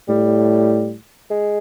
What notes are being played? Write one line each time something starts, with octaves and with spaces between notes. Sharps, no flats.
A2 G3
G#3